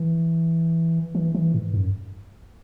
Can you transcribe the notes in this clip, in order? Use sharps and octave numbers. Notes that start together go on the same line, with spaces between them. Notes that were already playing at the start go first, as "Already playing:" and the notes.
Already playing: E3
E3
E3
G#2
F#2